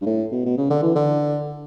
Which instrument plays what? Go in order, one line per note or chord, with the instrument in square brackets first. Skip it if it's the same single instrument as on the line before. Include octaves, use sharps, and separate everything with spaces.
[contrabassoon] G2
A2
B2
B2
C#3
D3
E3
D3